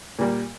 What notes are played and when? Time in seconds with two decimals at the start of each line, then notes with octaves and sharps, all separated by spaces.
0.19 A#2 G3 A#3